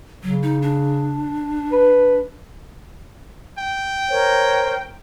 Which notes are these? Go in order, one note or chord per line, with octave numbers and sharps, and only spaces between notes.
C#3 F#3
D#4
D4
B4
G5
A#4 C5 C#5